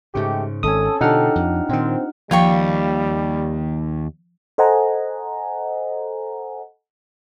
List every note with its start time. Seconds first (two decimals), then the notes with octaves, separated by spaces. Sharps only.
0.15 G#2 C#3 G#3 A3 G4 C#6
0.63 G#1 C4 C#4 A4 G#5 D#6
1.01 B2 D3 D4 D#4 F4 G4 F#5 F6
1.35 F2
1.69 A#2 D#3 C4
2.31 D#2 F3 G3 F4 G5 C#6
4.58 A4 C5 D#5 F#5 G#5 A#5